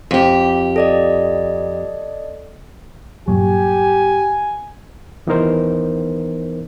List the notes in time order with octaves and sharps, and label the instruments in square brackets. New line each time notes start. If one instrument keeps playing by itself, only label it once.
[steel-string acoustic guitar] F2 G4
[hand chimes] A4 D5 D#5
[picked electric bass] G2 A#2 F#3 [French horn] G4 [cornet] G#5
[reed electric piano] D#2 E3 B3 D#4 A#4 C5